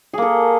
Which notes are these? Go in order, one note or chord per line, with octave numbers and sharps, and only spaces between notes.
A#3 G#4 A4